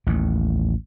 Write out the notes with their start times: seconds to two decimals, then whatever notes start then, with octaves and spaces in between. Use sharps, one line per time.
0.07 A1 D#2